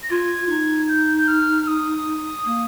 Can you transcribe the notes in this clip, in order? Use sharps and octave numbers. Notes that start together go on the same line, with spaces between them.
A#6
F4 G#6
D#4
G6
G6
F6
F6
D#6
A#3